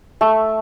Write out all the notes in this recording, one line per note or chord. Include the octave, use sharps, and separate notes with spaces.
A3